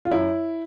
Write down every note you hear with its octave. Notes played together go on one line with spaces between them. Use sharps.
F4
F#2 E4